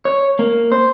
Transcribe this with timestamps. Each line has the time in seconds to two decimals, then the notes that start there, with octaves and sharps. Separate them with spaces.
0.05 C#5
0.39 A#3
0.72 C5